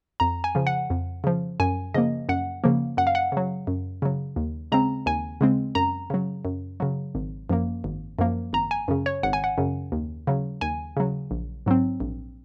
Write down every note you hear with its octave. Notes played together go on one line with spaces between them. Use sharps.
F2 A#5
G#5
C#3 F3
F#5
F2
C#3 F3
F#2 G#5
C#3 F3 A#3 D#5
F#2 F#5
C#3 F3 A#3
F#2 F#5
F5
F#5
C#3 F#3
F#2
C#3 F#3
D#2
C#3 G#3 C4 A#5
D#2 G#5
C#3 G#3 C4
F#2 A#5
C#3 F#3
F#2
C#3 F#3
G#1
F#2 F3 A#3
G#1
F#2 F3 A#3
G#1 A#5
G#5
F#2 C#3
C#5
G#1 F#5
G#5
F#5
F#2 C#3
D#2
C#3 F#3
D#2 G#5
C#3 F#3
A#1
G#2 F#3 C4
A#1